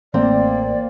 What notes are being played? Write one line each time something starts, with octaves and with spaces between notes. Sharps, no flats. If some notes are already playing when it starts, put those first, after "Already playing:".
A1 E3 A3 A#3 C4 D5